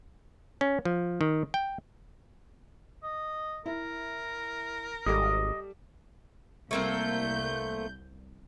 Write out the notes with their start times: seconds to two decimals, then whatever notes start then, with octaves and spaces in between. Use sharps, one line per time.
0.61 C#4
0.85 F3
1.21 D#3
1.54 G5
3.03 D#5
3.66 E4 A#4
5.06 G#1 G3 A4 D#5 D6
6.71 C2 A3 A#3 C4 G6